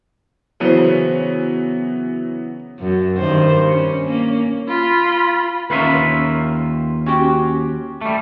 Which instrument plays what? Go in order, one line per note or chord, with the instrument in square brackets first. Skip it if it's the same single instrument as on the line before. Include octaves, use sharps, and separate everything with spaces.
[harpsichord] C#3 C5 [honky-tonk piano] E3 F#3 B3
[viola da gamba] F#2
G2 D#3 C5
C#4
A#3 C#4
[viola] F4 B5
[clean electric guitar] D#2 F4 E5 [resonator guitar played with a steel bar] C#4 A#4 B4
[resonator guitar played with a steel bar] C#4 F#4 G4
[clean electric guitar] G3 A3